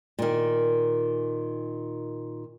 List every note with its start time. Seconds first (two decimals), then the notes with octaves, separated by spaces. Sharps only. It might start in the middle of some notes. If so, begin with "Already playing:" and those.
0.19 A#2 D#3